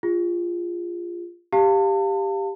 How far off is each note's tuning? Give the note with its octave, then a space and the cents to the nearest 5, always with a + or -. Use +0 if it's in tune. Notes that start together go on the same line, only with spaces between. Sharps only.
F4 -10 G#4 -35
G4 +5 F5 +0 A5 +35